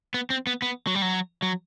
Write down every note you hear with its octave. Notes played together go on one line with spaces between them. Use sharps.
B3
C4
B3
B3
F#3
G3
F#3
F#3